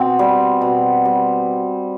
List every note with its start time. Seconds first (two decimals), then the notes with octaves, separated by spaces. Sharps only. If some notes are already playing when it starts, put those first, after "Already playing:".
Already playing: B2 C4
0.19 G3
0.62 B2
1.05 G3